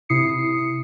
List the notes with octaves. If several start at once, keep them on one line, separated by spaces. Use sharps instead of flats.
C3 E4 D#6 C7 C#7